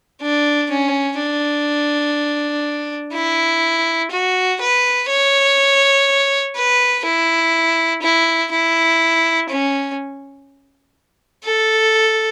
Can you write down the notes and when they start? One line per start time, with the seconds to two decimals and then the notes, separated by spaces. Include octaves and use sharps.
0.21 D4
0.70 C#4
1.19 D4
3.14 E4
4.11 F#4
4.60 B4
5.09 C#5
6.56 B4
7.05 E4
8.02 E4
8.51 E4
9.49 C#4
11.44 A4